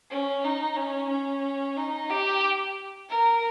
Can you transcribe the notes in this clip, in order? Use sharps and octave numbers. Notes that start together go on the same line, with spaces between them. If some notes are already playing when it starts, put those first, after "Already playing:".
C#4
D#4
C#4
C#4
D#4
G4
A#4